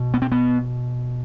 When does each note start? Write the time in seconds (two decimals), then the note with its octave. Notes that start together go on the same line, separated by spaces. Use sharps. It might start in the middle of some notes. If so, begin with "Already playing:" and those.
Already playing: B2
0.14 B3
0.22 C4
0.32 B3